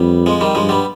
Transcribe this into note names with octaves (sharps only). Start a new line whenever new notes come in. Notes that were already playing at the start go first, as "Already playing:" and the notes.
Already playing: F2 G3 B3
F3 G#3
D#3 G3
G2 F3 G#3
G3 B3